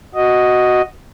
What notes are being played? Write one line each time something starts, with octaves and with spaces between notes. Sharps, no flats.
F#4 D#5